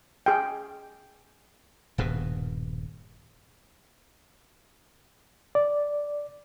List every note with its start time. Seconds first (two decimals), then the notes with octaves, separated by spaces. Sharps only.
0.26 G#4 G5
1.98 D#1 G2 B2
5.55 D5